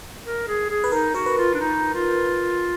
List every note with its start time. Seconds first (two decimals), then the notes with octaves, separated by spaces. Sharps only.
0.24 A#4
0.48 G#4
0.70 G#4
0.84 B4
0.92 D#4 A#4
1.14 F#4 A#4
1.26 B4
1.37 F4
1.54 D4
1.60 D#4
1.94 F4